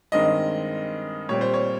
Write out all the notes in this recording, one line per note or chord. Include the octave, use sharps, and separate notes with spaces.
G2 D#3 G#3 C4 D#5
A#2 G3 C4 C#5
C5
C#5